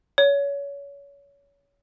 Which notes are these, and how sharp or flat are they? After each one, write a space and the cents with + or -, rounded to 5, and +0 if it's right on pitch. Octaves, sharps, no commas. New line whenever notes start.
C#5 +25